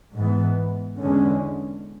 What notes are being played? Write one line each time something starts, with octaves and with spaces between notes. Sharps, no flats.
G#2 E3 B3
E2 D3 G#3 C#4